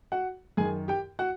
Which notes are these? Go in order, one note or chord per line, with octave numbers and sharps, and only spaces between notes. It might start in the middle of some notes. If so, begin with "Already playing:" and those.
F#4 F#5
F#2 D#3 G#4 G#5
G4 G5
F#4 F#5